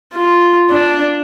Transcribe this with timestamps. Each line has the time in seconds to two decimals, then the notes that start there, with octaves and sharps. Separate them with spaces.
0.13 F4
0.70 D4